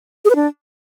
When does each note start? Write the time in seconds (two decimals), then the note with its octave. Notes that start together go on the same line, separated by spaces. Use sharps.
0.25 G#4
0.30 B4
0.35 D4